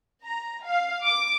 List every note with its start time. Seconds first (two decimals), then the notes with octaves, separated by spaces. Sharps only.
0.24 A#5
0.65 F5
1.04 D6